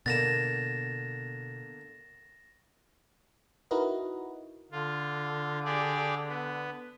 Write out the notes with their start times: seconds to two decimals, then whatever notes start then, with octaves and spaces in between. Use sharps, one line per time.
0.06 B2 D3 A#3 D4 A6 A#6 E7
3.71 D#4 E4 F#4 A#4 B4 D#5
4.72 D3 F4
5.65 G4 G#4 D5
6.28 B3